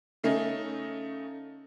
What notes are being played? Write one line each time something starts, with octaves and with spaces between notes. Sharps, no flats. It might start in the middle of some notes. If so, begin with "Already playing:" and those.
C#3 A3 C#4 D#4